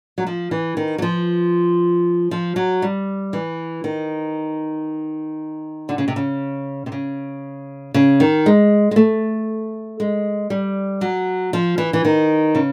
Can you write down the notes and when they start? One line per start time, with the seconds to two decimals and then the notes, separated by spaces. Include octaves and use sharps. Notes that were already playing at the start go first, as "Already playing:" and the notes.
0.18 F#3
0.27 F3
0.51 E3
0.77 D#3
0.98 F#3
1.02 F3
2.31 F3
2.56 F#3
2.82 G3
3.33 E3
3.84 D#3
5.89 D3
5.98 C#3
6.08 C3
6.16 C#3
6.86 C3
6.92 C#3
7.94 C#3
8.20 D#3
8.46 G#3
8.91 G#3
8.96 A3
10.00 G#3
10.50 G3
11.01 F#3
11.53 F3
11.78 E3
11.93 E3
12.05 D#3
12.55 C#3